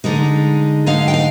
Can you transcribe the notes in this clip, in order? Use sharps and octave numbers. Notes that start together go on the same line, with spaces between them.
D3 G#3 D#4
D3 G#3 D#4 F5
G5
F5